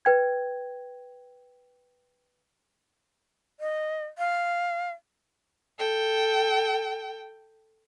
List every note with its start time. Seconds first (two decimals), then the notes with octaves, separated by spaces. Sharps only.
0.05 B4 G5 G#6
3.60 D#5
4.18 F5
5.79 A4 G5